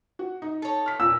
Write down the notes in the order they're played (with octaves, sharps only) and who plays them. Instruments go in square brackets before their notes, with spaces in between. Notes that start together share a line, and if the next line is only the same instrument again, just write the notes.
[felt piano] F#4
D#4
[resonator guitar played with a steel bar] A4 C#5
[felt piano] F6 B6
[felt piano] A#2 [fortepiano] E6